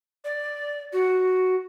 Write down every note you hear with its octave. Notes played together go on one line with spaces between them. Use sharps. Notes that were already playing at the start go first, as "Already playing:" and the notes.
D5
F#4